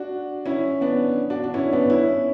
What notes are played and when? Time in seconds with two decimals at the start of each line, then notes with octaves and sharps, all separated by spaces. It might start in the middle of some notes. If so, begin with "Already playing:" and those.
Already playing: D4 F#4
0.46 C#4 E4
0.81 B3 D4
1.30 D4 F#4
1.44 D4
1.54 C#4 E4
1.73 B3 D4
1.90 C#4 E4